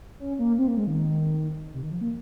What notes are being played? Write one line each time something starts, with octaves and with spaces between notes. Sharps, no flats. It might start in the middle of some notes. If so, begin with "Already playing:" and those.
C#4
A#3
C4
A#3
G#3
D#3
C3
D#3
F3
A#3